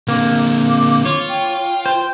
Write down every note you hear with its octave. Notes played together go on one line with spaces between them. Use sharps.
D3 A#3 C4 D6
F4 C#5
G5
C5